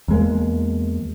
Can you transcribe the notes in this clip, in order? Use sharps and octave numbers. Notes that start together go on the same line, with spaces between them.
E2 G#3 A#3